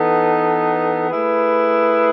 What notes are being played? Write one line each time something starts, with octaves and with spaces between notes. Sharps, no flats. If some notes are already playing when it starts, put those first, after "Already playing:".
Already playing: E3 B3 D#4 A4
A3 E4 G#4 B4